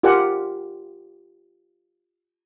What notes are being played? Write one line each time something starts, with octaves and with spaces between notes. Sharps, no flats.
F4 G4 A#4 D5 F#5 G#5